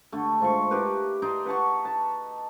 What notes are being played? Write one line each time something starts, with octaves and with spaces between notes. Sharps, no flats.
D3 A3
G#2 F4 C5 C#6
E4 G4 A#4 B4
D#4 D5 G5 C6
B4 F#5 A5 C#6
A5